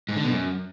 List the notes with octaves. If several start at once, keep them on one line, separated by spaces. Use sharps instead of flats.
G#2
D3
B2
F#2